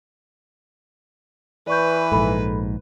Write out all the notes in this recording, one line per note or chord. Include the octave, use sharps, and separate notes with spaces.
E3 B4 D5 C#6 G6
A#1 G#2 A4 B5